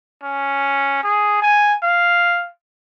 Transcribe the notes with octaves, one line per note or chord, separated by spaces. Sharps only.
C#4
G#4
G#5
F5